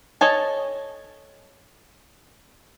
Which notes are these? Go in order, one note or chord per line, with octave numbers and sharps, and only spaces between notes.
A4 C#5 D#5 G#5 A5